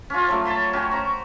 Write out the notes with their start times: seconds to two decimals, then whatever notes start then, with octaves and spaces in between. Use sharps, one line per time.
0.10 C#4 F4
0.27 F3 F#3 A3
0.45 C#5 A5 B5 C6
0.73 C#4 F#4 G4
0.91 C5 A#5